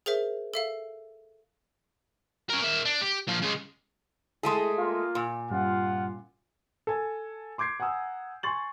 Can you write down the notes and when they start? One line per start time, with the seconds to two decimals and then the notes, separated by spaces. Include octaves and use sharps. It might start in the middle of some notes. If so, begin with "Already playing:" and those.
0.06 G#4 A#4 C5 E5
0.54 A4 E5 F5
2.50 C#4 A#4
2.62 A#3 E5
2.85 D4
3.01 G4
3.28 A#2 F3
3.42 C#3 G#3
4.43 G#3 A3 E4 G#4
4.78 A#3 F4 F5
5.15 A#2
5.50 G2 G3 C#4 F4 F5 F#5
6.87 A4 G#5 A5
7.58 C6 D6 G6 G#6 C7
7.80 F#5 G#5 A#5 D#6 E6
8.43 G#5 C6 C#6 A6 F#7